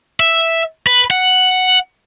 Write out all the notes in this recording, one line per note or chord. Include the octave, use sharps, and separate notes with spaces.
E5
B4
F#5